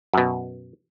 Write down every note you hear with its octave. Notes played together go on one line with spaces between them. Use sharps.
F#2 B2